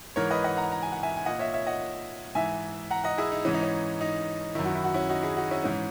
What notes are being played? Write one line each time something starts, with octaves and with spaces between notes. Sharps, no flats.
G#2 E3 A#4 C#5
B4 D#5
D#5 F#5
F#5 A#5
A#5
G#5
F#5
E5 G#5
G#5
A#2 D#5 F#5
C#5 E5
C#5 E5
D#5 F#5
G#2 E3 E5 G#5
F#5 A#5
D#5 F#5
E4 G#4
D#4
G#2 E3 C#4
D#4
C#4
D#4
F#2 D#3 E4
F#4
E4
F#4
C#4 E4
D#4 F#4
E4 G#4
D#4 F#4
C#4 E4
G#2 E3 C#4